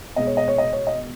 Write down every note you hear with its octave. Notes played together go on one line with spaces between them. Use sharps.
B2 G#3 D#5
C#5
D#5
C#5
D#5
C#5
D#5